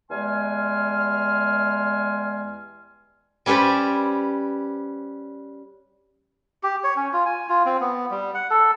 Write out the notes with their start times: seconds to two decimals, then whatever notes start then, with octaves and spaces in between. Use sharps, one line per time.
0.11 E2 G3 G#3 G#5 C6 F6
3.46 G3 C#4 G4 B4 C5 D5
6.63 G4
6.84 C#5
6.96 C#4
7.13 F4
7.25 G#5
7.49 F4
7.66 C4
7.81 B3
8.11 G3
8.35 F#5
8.50 A4